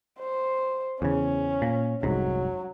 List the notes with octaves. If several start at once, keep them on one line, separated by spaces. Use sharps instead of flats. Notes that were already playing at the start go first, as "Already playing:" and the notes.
C5
E2 C#3 C#4
A#2
F1 C2 G#2 F#3